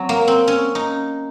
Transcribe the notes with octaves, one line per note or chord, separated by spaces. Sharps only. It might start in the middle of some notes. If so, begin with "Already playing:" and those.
Already playing: F#3 C4
A#3
C4
C#4
D#4